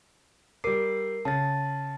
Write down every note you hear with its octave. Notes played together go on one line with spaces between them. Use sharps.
G3 A#4 D6 C7
C#3 A5 A6